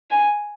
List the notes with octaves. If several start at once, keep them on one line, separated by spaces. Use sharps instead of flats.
G#5